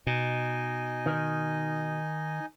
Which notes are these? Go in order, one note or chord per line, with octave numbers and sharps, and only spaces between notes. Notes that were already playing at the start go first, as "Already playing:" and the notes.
B2 D#4 D#5 G#5
D#3